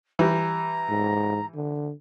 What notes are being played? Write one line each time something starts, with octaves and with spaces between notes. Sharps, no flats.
E3 G3 A#5
G#2
D3